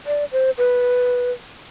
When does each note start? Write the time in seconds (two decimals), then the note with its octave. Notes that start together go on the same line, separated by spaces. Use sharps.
0.06 D5
0.32 C5
0.58 B4